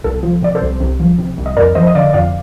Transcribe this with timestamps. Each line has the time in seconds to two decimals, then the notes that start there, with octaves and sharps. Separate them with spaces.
0.04 C2 A4
0.23 F3
0.42 C3 D5
0.55 A4 C5
0.61 C2
0.80 C2
1.00 F3
1.19 C3
1.37 C2
1.46 D#5
1.57 F2 A#4 D5
1.75 F3 C5 D#5
1.87 D#5
1.95 D3 D5 F5
2.13 F2 D5 F5